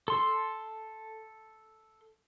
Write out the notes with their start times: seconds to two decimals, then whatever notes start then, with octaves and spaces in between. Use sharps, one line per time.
0.08 A4 C6